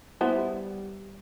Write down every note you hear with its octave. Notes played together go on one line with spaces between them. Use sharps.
G3 B3 E4 C5